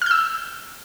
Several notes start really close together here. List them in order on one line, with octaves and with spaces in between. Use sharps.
F6 G6 E6